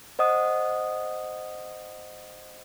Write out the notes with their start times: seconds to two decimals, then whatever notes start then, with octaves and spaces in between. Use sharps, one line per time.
0.19 C5 D#5 F#5 D#6